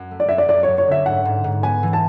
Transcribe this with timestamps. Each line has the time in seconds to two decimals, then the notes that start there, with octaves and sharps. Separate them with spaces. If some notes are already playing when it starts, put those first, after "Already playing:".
Already playing: F#2
0.11 A3
0.20 D5
0.29 F#2 E5
0.38 D5
0.48 F#2 D5
0.63 C#5
0.68 F#2
0.78 C#5
0.88 D3 E5
1.06 G#2 F#5
1.25 G#2
1.44 G#2
1.63 B3 G#5
1.83 E3
1.93 A5